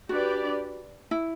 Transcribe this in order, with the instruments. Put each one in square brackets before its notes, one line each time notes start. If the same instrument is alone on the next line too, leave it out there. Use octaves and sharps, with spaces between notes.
[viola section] D4 G4 B4 D5 [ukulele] F#4
[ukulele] E4